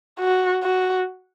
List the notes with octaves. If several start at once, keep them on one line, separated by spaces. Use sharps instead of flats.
F#4
F#4